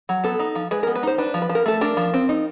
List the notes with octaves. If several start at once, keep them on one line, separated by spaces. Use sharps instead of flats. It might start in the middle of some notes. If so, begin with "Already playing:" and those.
F#3
B3 A4
D#4
F3
G#3 B4
B3 A#4
B4
D#4 C5
D4 B4
F3
B4
F3
A#4
A3 A4
D4 A#4
F3
C4
D#4